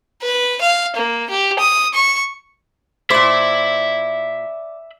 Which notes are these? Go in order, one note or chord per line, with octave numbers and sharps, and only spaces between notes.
B4
F5
A#3
G4
D#6
C#6
A#2 C5 D5 E5 B5